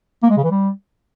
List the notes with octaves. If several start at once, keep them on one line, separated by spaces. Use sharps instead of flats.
A#3
G#3
C#3
E3
G3